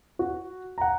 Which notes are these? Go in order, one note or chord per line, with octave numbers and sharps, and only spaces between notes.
F#4
F#5 A#5